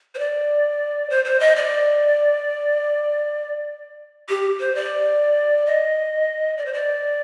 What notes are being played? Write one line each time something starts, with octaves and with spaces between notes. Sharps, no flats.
C5
D5
C5
C5
D#5
D5
G4
C5
D5
D#5
D5
C5
D5